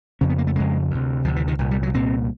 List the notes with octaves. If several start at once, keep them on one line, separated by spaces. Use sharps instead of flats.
F2 C#3 C#4
B3
A#3
A3
F2 C#3 G#3
D2 C3
D2 C3 F3
E3
D#3
C2 A#2
G3
F#3
C2 A#2 C4